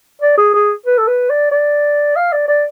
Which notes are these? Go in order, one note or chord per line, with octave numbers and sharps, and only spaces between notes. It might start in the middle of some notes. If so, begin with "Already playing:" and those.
D5
G#4
G#4
B4
A4
B4
D5
D5
F5
D5
D5